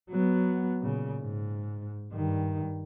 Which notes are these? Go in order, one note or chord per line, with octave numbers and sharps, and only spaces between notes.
F#3 B3
A#2 C#3
G#2
G2 D#3